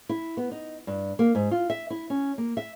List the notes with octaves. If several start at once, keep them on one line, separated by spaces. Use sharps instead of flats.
E4
B3
D#4
G2
A#3
G#2
F4
E5
E4
C#4
A#3
E5